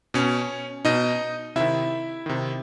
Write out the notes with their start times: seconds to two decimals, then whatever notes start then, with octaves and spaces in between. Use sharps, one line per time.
0.14 B2 C#4 C#5
0.85 B2 D#4 D#5
1.56 C3 D#3 E4 E5
2.26 C3 D#3